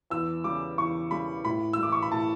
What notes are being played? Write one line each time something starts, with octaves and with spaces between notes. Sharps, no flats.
E2 E6
C#3 G3 D6
E2 C#6
C#3 G3 B5
A2 B5
E6
E3 G3 D6
C#6
B5
A2 A5